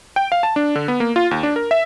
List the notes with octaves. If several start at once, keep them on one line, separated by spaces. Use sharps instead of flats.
G5
F5
A5
D4
D3
B3
A#3
F4
D#2
D4
A#4
E5